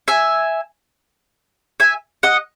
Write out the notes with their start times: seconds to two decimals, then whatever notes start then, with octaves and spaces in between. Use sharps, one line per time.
0.08 E5 G#5
1.80 E5 G#5
2.23 D#5 F#5